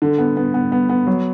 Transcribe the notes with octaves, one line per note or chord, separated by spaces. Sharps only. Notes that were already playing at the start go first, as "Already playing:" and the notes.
D3
B3
B3
B3
B3
B3
F#3